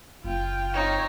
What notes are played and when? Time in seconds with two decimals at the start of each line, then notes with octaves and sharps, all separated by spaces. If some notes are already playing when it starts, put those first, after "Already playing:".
0.24 F#1 F4 G5
0.74 C4 D#4 C#5